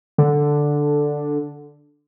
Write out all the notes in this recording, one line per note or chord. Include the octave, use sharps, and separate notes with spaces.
D3